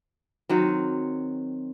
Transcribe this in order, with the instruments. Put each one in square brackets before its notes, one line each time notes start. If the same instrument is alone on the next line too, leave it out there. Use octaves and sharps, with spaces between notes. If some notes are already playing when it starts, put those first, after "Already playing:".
[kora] D#3 F#3 C4